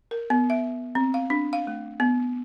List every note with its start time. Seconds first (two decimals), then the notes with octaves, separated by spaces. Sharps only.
0.11 A#4
0.30 B3
0.50 E5
0.95 C4
1.14 F5
1.30 D4
1.53 F5
1.67 A3
2.00 B3